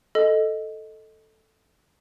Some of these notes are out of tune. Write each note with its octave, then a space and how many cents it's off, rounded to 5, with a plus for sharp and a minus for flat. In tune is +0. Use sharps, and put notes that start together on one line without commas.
A4 +0 D#5 +0